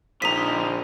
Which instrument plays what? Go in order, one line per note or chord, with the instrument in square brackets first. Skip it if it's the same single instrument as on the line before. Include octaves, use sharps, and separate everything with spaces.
[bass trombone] A#1 [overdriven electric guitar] D3 D#5 [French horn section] C4 D#4 [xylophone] A#5 B6